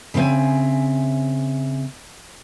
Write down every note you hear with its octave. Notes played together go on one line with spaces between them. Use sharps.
C#3 C4 B4 D#5 E5 G#5